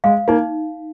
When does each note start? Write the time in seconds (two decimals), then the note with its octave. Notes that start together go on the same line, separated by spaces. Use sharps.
0.04 G#3 F5
0.28 A#3 D#4